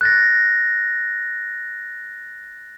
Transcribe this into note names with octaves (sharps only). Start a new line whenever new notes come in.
F#6 A6 A#6